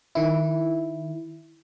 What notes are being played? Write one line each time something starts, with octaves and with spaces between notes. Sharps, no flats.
D#3 E4